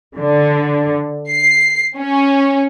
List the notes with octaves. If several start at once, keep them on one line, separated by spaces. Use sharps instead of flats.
D3
C7
C#4